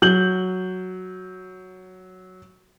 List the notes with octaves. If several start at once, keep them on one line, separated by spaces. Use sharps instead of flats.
F#3 G6 F#7